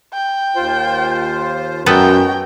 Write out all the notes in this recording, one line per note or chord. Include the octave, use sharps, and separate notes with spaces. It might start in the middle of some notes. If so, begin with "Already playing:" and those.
G5
D#2 F4 C5
F#2 G#3 B3 F#4 A4 B4 G5 A#5